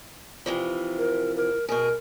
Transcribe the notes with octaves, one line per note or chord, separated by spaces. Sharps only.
C3 E3 F3
A#4
A#4
B2 G#4 A#4